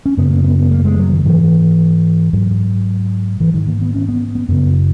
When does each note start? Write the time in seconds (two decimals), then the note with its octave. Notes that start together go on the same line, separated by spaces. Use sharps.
0.06 C#4
0.17 F#2 C#3 B3
0.31 A#3
0.44 B3
0.58 B3
0.71 A#3
0.85 G#3
0.98 F#3
1.12 D#3
1.25 G#2 E3
2.33 G#2 F#3
3.40 G#2 E3
3.54 D#3
3.67 A#3
3.82 B3
3.94 C#4
4.09 B3
4.35 B3
4.48 F#2 C#3 B3